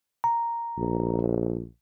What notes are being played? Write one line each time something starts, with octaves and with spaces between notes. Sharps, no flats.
A#5
A#1